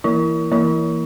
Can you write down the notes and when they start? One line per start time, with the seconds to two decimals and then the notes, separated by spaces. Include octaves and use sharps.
0.04 E3 E4
0.52 E3 E4